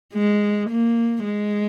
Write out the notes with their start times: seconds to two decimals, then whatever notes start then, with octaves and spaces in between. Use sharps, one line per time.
0.14 G#3
0.69 A#3
1.24 G#3